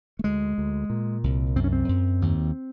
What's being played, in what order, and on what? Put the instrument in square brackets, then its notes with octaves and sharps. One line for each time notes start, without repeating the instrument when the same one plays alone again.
[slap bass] A3
D2 G#3
D2
A#2
C2
F#2 C4
C#4
C4
F#2
D#2